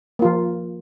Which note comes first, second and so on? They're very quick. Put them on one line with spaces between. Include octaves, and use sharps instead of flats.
A#3 F4 F3